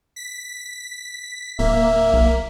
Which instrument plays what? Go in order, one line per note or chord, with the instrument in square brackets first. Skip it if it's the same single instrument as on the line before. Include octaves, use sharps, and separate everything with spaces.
[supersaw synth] B6
[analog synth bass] D1 [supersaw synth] A#3 [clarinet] E5
[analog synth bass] B1